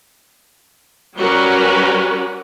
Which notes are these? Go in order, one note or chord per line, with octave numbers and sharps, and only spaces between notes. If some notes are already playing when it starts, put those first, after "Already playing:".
F#3 G3 C#4 F#4 A#4 B4